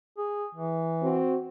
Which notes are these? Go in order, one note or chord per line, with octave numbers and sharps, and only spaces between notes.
G#4
E3
C4 F#4